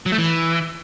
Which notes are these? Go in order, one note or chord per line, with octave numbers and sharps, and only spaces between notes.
F#3
A3
E3